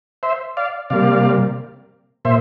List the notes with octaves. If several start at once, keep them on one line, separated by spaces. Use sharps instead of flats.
C5 E5
D5 F5
C3 G3 A#3 D5 F5
A#2 C5 E5